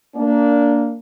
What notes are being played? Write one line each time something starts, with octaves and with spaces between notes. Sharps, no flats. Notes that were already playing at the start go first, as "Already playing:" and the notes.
A#3 D4